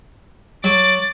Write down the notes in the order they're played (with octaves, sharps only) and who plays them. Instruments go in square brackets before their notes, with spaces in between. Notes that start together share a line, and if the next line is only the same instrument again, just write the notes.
[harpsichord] F#3 [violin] D6 A6